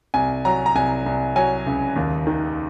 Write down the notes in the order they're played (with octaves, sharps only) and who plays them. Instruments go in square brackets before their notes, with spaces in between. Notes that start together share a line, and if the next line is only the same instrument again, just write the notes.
[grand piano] C2 G#5
F#3 A#5
A#5
C2 G#5
C2
F#3 G#5
C#2
D#2
D#3